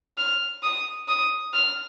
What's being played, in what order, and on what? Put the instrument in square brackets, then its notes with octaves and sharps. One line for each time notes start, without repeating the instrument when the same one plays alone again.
[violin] F6
D#6
D#6
F6